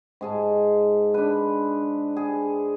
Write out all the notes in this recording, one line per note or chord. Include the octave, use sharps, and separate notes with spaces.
G#2 G#4 A5
D4 B4
G#4